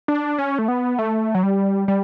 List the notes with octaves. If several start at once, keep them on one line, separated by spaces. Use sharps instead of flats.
D4
C#4
A3
B3
A3
F#3
G3
G3